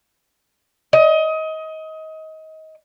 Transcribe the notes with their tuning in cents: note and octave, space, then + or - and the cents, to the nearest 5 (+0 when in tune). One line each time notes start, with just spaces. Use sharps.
D#5 +25